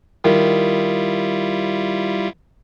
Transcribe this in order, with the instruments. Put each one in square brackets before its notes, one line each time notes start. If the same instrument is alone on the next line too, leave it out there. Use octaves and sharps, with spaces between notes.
[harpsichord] D#3 [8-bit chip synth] G3 E4 F4